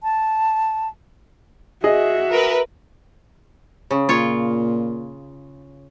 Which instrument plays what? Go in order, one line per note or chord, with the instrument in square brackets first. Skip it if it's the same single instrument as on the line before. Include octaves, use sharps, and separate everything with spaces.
[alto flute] A5
[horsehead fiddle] F#4 E5 [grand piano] G#4 D#5
[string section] A#4 B4
[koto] C#3
[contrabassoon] A#2 [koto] F4 C#5